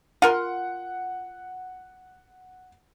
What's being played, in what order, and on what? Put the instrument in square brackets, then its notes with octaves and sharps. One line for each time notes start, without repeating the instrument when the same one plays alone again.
[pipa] F4 A#4 C6 [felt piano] F#5